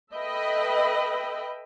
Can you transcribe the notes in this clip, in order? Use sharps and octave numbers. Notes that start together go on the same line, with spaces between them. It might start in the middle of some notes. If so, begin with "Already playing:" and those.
A4 B4 D#5 E5 G5 B5